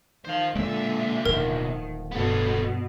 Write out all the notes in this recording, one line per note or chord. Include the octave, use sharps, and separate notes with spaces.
D#3 C5 F5
B1 A#2 D3 G#3 A#3 E5
D1 D#3 F3 A#4
G2 B2 B3 A4